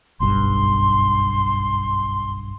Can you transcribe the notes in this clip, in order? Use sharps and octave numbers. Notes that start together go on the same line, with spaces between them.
F#1 B1 G2 C6